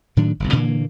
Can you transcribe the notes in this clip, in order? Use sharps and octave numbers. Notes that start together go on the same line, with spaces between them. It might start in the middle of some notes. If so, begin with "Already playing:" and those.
A2 D#3 F#3 D4
G1 C2
A#2 D3 E3 A#3